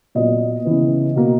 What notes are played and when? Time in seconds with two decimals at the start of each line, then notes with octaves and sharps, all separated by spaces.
0.15 A#2 F#3 B3 D#5
0.65 C#3 E3 B3
1.16 B2 A#3